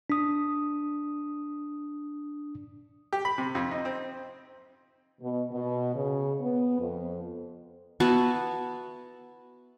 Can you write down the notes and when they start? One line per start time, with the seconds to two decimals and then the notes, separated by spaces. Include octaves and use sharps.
0.10 D4 D#6
3.13 G4
3.25 B5
3.38 C3
3.55 F2
3.71 D#4
3.85 C4
5.21 B2
5.51 B2
5.95 C#3
6.41 B3
6.79 F2
8.00 B3 E4 F#4 A5